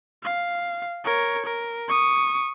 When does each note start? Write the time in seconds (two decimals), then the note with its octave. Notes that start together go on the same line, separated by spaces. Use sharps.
0.23 F5
1.05 A#4 C#5
1.46 A#4
1.88 C#6 D#6